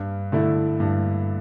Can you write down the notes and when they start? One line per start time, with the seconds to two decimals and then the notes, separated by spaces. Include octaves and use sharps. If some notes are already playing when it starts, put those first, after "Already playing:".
Already playing: G2
0.32 D3 A3 E4
0.80 G2